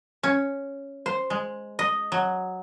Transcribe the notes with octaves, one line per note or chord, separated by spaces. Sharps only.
C#4
C5
G#3
D#5
F#3